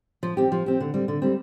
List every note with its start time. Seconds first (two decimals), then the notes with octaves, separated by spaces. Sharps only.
0.23 F3
0.37 C4 G4
0.52 F3
0.66 C4 G4
0.80 D3
0.94 G3 C4
1.08 D3
1.22 G3 C4